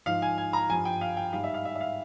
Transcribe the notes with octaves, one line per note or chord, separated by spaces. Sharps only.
G#2 F3 F5
G#5
G#5
A#5
G2 F3 G#5
G5
F5
G5
G#2 G3 F5
E5
F5
E5
E5
F5